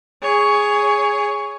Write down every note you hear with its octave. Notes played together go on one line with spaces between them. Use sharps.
G#4 C#5